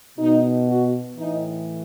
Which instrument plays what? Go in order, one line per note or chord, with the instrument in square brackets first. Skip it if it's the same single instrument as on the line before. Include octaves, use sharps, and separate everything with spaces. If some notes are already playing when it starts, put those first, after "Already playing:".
[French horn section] B2 D#4
F#4
A2 E3 D#4